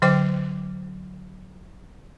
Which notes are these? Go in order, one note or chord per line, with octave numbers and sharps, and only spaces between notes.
D3 F#3 C5 G5 D6